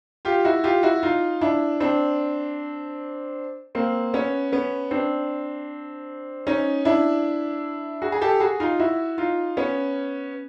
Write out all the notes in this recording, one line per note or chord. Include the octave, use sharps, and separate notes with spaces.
F4 G4
E4 F#4
F4 G4
E4 F#4
D#4 F4
D4 E4
C4 D4
A#3 C4
B3 C#4
B3 C#4
C4 D4
C#4 D#4
D4 E4
F#4 G#4
G#4
G4 A4
F#4 G#4
D#4 F4
E4 F#4
D#4 F4
B3 C#4